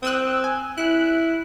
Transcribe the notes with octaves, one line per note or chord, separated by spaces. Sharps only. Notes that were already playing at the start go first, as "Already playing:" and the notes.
C4 D#6 E6 F#6
G#5
E4 F#6